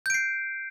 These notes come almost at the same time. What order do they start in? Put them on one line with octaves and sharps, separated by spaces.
G6 D7 C7